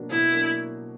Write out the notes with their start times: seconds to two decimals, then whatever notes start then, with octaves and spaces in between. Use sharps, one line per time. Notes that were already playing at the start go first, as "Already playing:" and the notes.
Already playing: B2 F#3 A#3 D4
0.10 B2 E4
0.30 F#3 A#3 D4